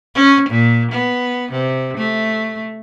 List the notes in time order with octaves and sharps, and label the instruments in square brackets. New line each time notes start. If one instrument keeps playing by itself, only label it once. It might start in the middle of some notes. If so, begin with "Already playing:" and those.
[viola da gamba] C#4
A#2
B3
C3
A3